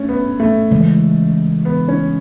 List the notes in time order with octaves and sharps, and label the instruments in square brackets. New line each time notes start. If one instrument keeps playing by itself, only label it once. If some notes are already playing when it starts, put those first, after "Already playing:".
Already playing: [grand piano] A3 C#4
B3
A3
[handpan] C#3 E3 G#3
[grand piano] B3
C#4